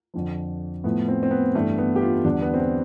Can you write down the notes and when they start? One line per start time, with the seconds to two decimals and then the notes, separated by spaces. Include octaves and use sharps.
0.14 F2 D3 F3
0.84 A2 F3 B3
1.08 C4
1.23 C4
1.31 B3
1.55 G2 E3 G3 A3
1.78 B3
1.96 G4
2.01 F4
2.24 E2 D3 G3 D4
2.42 B3
2.54 C4
2.60 B3